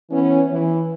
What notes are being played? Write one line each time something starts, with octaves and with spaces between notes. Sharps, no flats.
E3 B3 C#4
E3